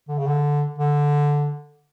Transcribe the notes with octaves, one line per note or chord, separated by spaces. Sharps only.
D3
C#3
D3
D3